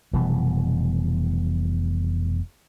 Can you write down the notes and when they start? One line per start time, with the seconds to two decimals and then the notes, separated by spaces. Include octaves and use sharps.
0.13 F1 B2 E3 G3